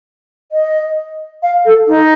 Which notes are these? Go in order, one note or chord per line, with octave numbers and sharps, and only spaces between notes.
D#5
F5
A4
D#4